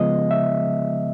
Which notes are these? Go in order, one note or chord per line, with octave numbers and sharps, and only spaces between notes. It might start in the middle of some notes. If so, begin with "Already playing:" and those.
Already playing: C#3 F3 G#3 B3 D#5
E5